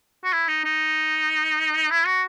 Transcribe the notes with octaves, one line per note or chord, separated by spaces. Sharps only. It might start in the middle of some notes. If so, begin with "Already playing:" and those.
F#4
E4
D#4
D#4
E4
F#4